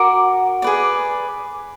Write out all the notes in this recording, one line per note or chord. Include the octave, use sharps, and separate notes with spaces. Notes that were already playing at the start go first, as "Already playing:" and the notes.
Already playing: F#4 A#4 D6
G#4 B4 D5